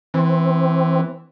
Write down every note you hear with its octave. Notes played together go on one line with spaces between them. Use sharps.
E3 C4